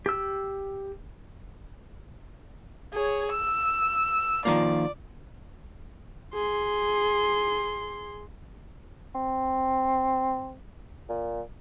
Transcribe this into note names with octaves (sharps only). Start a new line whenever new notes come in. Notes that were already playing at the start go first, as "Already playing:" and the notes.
G4 E6
G#4 C#5
E6
D#3 F3 A#3 D5
G#4 C6
C4
A#2